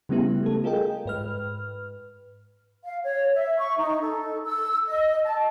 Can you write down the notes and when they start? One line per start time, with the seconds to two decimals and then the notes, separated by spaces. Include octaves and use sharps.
0.09 C#3 G3 A3 B3 E4 G4
0.43 A3 A4
0.64 F4 G#4 A#4 D#5 G5
1.06 G#2 B4 F6
2.84 F5
3.04 C#5
3.35 E5
3.59 C#6
3.78 D#4
4.02 A4
4.46 E6
4.86 D#5
5.25 A5